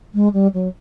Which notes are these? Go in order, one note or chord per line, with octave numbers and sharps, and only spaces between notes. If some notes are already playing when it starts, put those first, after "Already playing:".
G#3
G3
F#3